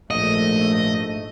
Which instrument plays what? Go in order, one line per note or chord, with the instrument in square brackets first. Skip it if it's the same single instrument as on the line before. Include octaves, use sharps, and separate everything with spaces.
[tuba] A#1 [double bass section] G#2 A3 [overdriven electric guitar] D#5